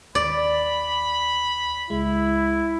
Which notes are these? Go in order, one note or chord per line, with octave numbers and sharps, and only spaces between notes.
D#2 D5 B5
C#2 G#3 E4